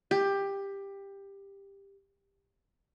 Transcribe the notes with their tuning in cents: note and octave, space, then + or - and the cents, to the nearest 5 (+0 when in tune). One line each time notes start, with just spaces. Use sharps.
G4 +15